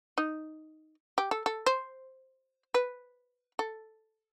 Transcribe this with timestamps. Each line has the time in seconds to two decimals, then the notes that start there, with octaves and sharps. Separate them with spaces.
0.18 D#4
1.18 G4
1.31 A4
1.46 A4
1.66 C5
2.74 B4
3.59 A4